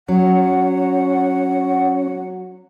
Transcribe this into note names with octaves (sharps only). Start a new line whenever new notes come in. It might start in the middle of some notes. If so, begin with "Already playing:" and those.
F#3 C#4 F#5